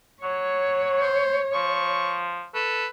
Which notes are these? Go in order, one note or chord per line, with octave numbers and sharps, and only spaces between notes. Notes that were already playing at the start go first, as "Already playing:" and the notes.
F#3 C#5
C5
F3 C#6
A4 B4